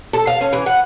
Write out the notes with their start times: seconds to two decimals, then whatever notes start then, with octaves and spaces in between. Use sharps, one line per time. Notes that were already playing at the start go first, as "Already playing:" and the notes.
0.13 A4
0.27 F5
0.41 C#4
0.53 E3
0.66 F#5